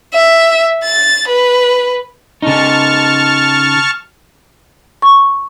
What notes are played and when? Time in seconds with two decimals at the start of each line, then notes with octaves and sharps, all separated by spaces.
0.14 E5
0.84 A6
1.28 B4
2.42 C#3 D#4 A5 C#6 F6
5.02 C#6